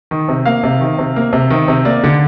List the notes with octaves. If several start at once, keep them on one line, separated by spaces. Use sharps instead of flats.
D#3
C3
A#3 F5
C3
D#3
C3
A#3
C3
D#3
C3
A#3 D5
D3